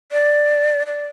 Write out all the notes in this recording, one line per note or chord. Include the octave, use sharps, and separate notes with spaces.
D5
D5